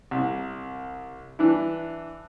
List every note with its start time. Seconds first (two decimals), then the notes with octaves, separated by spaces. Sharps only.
0.11 C2
1.39 E3 D4 E4